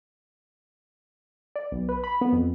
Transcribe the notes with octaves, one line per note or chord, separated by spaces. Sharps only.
D5
B1
B4
B5
B3
F2